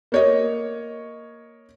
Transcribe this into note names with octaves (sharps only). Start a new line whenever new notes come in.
A#3 C#5 D#5